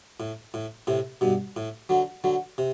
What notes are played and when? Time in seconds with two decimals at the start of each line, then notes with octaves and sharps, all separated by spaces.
0.20 A2
0.54 A2
0.87 A2 C3
1.21 G2 B2
1.56 A2
1.89 D3 F#3
2.24 D3 F#3
2.58 C3